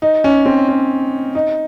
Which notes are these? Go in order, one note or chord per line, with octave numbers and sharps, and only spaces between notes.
D#4
C#4
C4
C#4
D#4